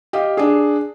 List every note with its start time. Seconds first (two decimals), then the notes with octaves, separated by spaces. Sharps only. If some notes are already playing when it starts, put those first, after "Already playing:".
0.13 G4 D#5 F5
0.37 D4 G#4